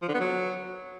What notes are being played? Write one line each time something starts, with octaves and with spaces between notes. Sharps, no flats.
F3
D3
B3
F#3